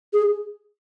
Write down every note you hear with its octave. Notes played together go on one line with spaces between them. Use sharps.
G#4